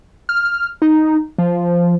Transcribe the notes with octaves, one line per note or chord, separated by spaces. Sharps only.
F6
D#4
F3